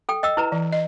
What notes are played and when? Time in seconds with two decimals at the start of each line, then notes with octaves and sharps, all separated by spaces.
0.09 A4 G5
0.23 D#5 G5 E6
0.37 E4 B4 A#5
0.52 E3
0.73 D#5